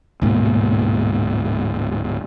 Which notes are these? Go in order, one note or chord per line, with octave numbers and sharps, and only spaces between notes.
D1 G#2 B2 A#3